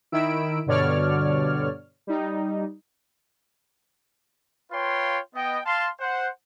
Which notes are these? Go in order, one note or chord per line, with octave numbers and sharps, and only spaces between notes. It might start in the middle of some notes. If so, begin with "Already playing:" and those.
D#3 E4 B5 E6 D7
G2 B2 D3 C#5 D5 F6
G3 D#4
F4 B4 C#5 F5 G5 C6
B3 D#5 G5
F5 A5 C6
C5 F#5